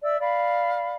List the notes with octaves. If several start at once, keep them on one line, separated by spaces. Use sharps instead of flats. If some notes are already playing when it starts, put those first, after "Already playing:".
D5 E5 E6
D5 F5 B5